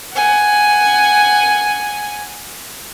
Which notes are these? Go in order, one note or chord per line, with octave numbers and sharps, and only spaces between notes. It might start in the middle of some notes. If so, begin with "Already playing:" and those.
F#5 G#5